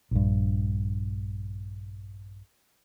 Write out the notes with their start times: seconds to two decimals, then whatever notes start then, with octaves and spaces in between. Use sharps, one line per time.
0.11 A#1 G2